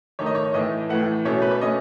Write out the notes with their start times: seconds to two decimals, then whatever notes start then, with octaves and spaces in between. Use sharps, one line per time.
0.19 D#3 A3 D#4 C#5
0.26 D#5
0.35 C#5
0.54 A2 E3 A3 D#5
0.89 A2 E3 A3 F#5
1.25 B2 A3 C#4 C#5
1.42 B4
1.51 C#5
1.61 B2 A3 C#4 D#5